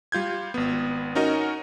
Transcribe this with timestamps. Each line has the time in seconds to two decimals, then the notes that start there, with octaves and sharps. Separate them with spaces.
0.12 G3 F4 G6 G#6
0.54 G#1 B3
1.15 C#4 D#4 F#4 A#4 D#5